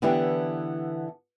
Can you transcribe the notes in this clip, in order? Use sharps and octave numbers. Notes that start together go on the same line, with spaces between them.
D3 E3 B3 D4 E4 G4